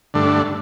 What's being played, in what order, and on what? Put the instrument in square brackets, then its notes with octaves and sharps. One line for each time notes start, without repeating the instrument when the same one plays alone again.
[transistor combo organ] G2 D3 A3 D4